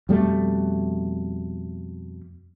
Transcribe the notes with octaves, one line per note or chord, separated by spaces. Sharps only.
F2 B2 G3 A3